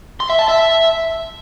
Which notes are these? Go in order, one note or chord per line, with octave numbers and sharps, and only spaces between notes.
C6
E5
A5
E5